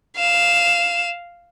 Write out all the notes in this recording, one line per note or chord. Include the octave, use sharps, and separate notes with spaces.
F5 E7